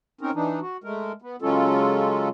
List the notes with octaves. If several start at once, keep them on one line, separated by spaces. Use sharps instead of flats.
C4 C#4 D#4 A#4
E3 D4 D#4
F#4
G#3 A3 A#4
B3
C#3 F#3 G#3 C#4 F4 A4